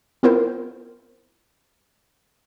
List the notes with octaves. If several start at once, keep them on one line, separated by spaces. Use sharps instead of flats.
B3 C4 E4 F4 A#4 C5